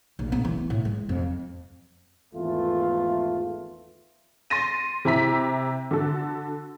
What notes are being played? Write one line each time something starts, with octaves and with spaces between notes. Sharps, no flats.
A#1
B3
E3
A2
G#3
F2
G#1 E2 E3 A3 F4
C6 A6 A#6 D#7
C3 E4 A#5 B6
D3 F#4 A4